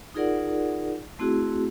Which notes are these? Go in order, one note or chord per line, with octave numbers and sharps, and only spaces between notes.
D#4 F4 G#4 A#4 D5 F#5
A3 C4 E4 F#4 G#4